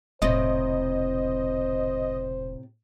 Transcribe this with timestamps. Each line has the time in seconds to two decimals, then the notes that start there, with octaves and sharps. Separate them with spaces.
0.22 E1 A2 C3 C5 D#5